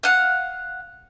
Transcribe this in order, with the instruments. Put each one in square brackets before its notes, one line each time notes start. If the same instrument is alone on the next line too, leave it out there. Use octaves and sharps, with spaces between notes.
[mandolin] F5 F#5